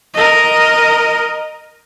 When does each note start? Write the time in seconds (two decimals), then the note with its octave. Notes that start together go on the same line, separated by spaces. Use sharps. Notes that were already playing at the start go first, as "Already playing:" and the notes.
0.14 A#4 D#5